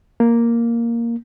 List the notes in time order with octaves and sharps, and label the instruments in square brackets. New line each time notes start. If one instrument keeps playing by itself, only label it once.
[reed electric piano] A#3